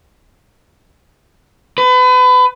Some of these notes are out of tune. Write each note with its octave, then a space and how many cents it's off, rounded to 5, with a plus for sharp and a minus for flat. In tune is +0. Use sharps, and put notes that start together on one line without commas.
B4 +30